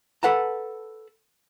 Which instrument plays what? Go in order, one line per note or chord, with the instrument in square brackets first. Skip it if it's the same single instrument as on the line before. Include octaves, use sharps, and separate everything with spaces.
[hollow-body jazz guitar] A4 B4 F#5 A5 A#5